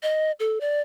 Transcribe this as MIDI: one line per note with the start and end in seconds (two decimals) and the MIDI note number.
0.03 0.32 75
0.40 0.59 69
0.61 0.81 74